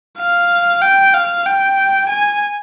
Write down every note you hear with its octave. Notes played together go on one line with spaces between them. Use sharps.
F5
G5
F5
G5
G#5